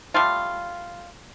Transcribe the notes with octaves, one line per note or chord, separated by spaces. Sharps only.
G3 A3 F4